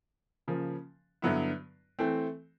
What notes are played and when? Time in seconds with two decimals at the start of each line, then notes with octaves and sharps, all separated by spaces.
0.48 C#3 F3 A#3
1.22 G2 D3 F#3 B3 E4
1.99 E3 A3 C4